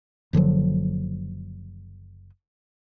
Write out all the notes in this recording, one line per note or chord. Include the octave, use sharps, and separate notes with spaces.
F#1 D3 F3 F#3